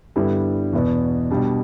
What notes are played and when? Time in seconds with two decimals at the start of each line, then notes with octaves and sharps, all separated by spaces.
0.16 G2 D3 G3 B3 E4
0.73 E2 B2 B3
1.31 B2 G3 D4